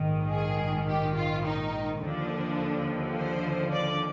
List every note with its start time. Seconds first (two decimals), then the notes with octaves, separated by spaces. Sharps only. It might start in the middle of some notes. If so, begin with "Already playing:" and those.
Already playing: A#1 G#2 D#3
0.30 G#4
0.88 G4
1.16 F4
1.44 D#4
2.01 D#2 D3 F3 D4
3.15 C5
3.73 D5